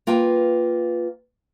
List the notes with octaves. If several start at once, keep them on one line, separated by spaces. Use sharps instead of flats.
A#3 F4 B4 G5